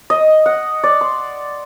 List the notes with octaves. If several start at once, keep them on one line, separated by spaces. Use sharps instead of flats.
D#5
F#5
D5
C6